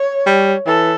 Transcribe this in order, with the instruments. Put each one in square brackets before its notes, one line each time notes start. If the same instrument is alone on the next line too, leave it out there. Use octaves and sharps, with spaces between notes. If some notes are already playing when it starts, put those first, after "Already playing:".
Already playing: [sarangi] C#5
[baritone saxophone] G3
[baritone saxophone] E3 [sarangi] A4